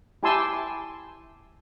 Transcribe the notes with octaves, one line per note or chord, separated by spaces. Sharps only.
E4 G4 G#5 A5 C6 E6